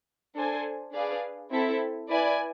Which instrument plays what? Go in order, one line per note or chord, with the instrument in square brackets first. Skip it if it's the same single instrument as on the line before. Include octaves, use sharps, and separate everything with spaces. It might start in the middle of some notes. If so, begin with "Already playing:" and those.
[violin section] D4 A4 C5 G#5
D4 G#4 B4 D5 F5
C4 E4 A4 E5
E4 B4 D5 G#5